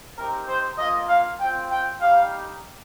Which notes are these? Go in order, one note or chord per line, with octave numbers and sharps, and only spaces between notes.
C4 D#4 G4 A#4
C5
A#3 F4 D#5
F5
C4 F4 G5
G5
G3 D#4 G4 F5